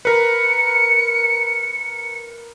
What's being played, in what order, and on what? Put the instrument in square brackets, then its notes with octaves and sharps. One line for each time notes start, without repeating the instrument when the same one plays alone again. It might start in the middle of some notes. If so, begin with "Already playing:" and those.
[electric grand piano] A#4 B4 [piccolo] C#7